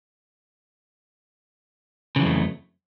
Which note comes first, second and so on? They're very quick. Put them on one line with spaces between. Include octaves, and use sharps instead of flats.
C#3 E3 F#3 F2 A3